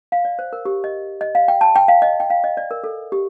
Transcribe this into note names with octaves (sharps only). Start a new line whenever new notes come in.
F5
D5
C5
A#4
G4
D#5
D#5
F5
G5
A5
G5
F5
D#5
G5
F5
D#5
D5
A#4
A4
G4